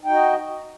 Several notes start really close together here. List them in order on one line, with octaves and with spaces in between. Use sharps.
D#4 G5 F#4 D#5